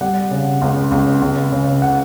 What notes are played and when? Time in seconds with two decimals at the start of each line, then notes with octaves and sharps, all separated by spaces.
0.01 G3 F#5
0.31 C#3
0.62 C#2
0.92 C#2
1.22 C#2
1.52 C#3
1.82 F#5